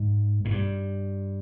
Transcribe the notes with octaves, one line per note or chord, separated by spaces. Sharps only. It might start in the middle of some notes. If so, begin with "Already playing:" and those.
Already playing: G#2
G#2
G2